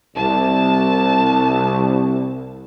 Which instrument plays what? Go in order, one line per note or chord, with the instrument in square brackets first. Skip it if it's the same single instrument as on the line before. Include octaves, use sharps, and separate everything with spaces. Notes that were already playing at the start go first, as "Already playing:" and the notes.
[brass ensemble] C2 [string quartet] A5